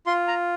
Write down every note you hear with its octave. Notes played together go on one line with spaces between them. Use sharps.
F4 C6
A#5